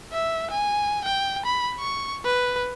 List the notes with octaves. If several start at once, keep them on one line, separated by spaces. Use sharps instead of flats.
E5
G#5
G5
B5
C#6
B4